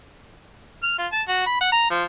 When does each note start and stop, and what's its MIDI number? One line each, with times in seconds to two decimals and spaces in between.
0.83 0.94 89
0.98 1.07 65
1.12 1.22 81
1.28 1.43 66
1.46 1.58 83
1.61 1.69 78
1.72 1.86 82
1.90 2.04 53